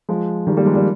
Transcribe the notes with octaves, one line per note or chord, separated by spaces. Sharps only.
F3 G#3
D#3 G3
G3 A#3
F3 G#3
G3 A#3